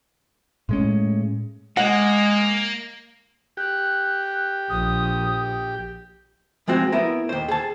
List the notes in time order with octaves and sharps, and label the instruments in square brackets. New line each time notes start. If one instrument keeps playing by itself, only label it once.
[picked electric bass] A2 G#3 C#4
[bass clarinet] G#3 [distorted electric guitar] A#3 [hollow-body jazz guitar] F#5
[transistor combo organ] G4 [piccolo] F#6
[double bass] A#1 [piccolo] D#6
[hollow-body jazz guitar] F3 G#3 C4 F#4
B3 E4 A#4
D#2 C5
G#4 A5